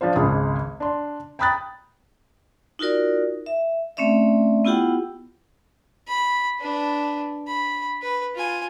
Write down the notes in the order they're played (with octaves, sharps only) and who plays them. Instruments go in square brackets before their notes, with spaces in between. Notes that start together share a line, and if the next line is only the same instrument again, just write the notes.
[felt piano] F3 D4 F4 C5
G#1 C#2 G#4 D#6
D4 C6
G5 A#5 B5 D#6 F#6 A6
[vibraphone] D#4 F4 F#4 A#4 D5
E5
A3 C4 C#4 D5 E5
B3 E4 F4 G4 F#5 G5
[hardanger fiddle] B5
D4 B4
B5
B4
F4 G#5